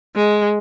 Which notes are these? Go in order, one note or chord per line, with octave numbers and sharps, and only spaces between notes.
G#3